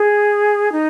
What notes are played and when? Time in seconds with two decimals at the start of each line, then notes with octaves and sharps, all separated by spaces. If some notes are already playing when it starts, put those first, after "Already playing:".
Already playing: G#4
0.72 D#4